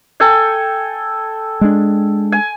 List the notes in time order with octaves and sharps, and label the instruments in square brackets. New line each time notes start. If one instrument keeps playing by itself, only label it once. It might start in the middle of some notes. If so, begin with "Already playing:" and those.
[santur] A4 G5 G#5
[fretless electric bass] G#3 D4
[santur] G#5